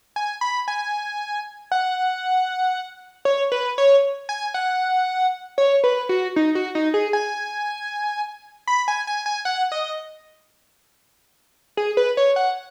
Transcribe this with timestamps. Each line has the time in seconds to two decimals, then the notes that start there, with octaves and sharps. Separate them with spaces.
0.16 G#5
0.41 B5
0.68 G#5
1.72 F#5
3.25 C#5
3.52 B4
3.78 C#5
4.29 G#5
4.54 F#5
5.58 C#5
5.84 B4
6.09 F#4
6.36 D#4
6.55 F#4
6.75 D#4
6.94 G#4
7.13 G#5
8.67 B5
8.88 G#5
9.07 G#5
9.26 G#5
9.45 F#5
9.72 D#5
11.77 G#4
11.97 B4
12.17 C#5
12.36 F#5